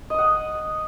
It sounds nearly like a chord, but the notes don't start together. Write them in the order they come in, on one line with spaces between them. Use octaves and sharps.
D#5 D#6 F#5